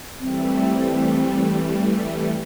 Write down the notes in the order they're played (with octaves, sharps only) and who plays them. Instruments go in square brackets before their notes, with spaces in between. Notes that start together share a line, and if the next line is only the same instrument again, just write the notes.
[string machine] E3 G3 A3 [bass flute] C4